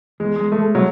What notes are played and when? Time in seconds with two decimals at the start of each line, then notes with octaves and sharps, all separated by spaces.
0.20 E2 G#3
0.36 G#3
0.52 G#3 A3
0.62 A3
0.75 F#3